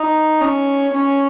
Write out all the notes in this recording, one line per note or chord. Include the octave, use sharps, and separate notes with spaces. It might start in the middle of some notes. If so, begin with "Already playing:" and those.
Already playing: D#4
C#4
C#4